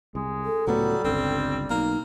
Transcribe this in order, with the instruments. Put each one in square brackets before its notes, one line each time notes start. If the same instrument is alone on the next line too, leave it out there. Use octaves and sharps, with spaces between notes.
[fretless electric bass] C2 [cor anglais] G#3
[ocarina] A4
[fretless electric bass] C#2 A2 B3 [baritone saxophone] F#3 [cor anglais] G3
[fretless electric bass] G1 C#2 G2 [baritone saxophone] C4
[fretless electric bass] B1 [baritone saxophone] A#3 [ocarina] D#4